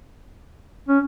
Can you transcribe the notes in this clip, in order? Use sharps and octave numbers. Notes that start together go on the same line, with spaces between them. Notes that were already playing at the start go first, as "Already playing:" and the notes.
C#4